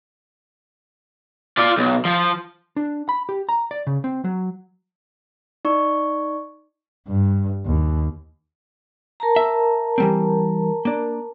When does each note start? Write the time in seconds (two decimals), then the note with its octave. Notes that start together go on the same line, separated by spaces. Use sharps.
1.58 F4 D5
1.78 B1
2.05 F3
2.76 D4
3.09 B5
3.29 G4
3.49 A#5
3.71 D5
3.87 C#3
4.04 C4
4.24 F#3
5.65 D#4 D5 C#6
7.08 G2
7.66 D#2
9.20 A#4 A5 A#5
9.36 E5
9.98 E3 G3 C4
10.85 A#3 D4